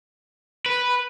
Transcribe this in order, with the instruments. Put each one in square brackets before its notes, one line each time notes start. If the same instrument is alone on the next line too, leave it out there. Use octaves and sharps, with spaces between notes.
[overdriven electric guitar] B4